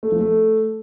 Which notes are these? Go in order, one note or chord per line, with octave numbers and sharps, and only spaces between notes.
A3
F3
A3